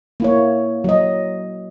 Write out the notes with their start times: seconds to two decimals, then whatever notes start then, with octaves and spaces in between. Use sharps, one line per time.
0.20 A#3 E4 C#5
0.84 F#3 D#5